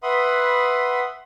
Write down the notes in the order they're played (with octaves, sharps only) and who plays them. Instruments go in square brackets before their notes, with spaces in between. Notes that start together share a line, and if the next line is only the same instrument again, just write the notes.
[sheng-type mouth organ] B4 E5 F#5 B5 C6 D#6